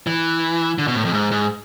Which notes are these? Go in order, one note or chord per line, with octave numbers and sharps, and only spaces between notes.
E3
D3
B2
A2
F2
G#2
G#2